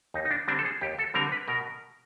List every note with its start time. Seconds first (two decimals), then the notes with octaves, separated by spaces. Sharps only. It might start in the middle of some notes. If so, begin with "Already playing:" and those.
0.14 D#2 D#4
0.25 D#4
0.31 D4
0.48 D3 G3 C4 D4
0.59 A4
0.65 G#4
0.81 D#2 G4
0.99 A4
1.14 D3 G3 C4 A#4
1.32 B4
1.48 B2 A#4